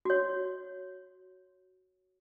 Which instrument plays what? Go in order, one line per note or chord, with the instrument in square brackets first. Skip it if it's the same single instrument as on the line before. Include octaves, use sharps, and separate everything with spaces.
[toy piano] F#4 C#5